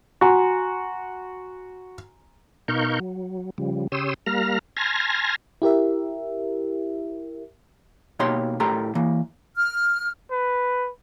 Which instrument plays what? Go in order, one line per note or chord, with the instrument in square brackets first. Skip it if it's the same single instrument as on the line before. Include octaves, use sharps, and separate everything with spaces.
[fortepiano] F#4 [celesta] G#5 A#5 C6
[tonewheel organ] B2 D#4 A#4 F5 C#6 G6
F#3
C#3 F3 G3
C#3 G4 C#5 C6 D#6 E6
G3 A#3 F5 A#5 F6
G#5 A5 C6 F6 G#6 A#6
[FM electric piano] E4 G4 A#4 E5
[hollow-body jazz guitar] B2 A#3 D#4 G4 C#5 C6
A2 G4 A4 A#4 A#5 C6
E3 A#3
[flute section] F6
[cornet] B4